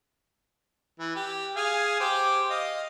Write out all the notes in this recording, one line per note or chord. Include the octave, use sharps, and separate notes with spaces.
E3
G4
G#4 F5 G#5
G4 C5 D6
D#5 F5